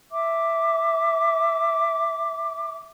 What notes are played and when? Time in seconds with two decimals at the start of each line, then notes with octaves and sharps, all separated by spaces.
0.12 E5 D6